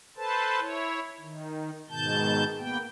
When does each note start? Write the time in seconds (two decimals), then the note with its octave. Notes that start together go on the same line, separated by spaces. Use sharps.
0.17 A4 B4 C5 A5
0.60 E4 C#5
1.20 D#3
1.90 G#2 B2 D#3 A5 G6
2.58 A#3 B3 G5